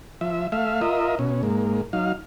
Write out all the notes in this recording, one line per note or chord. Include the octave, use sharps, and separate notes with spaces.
F3 E5
A3 E5 F5
F4 A#4 D#5 E5
B2 C#4
G#2 A#3
F#3 D#4 F5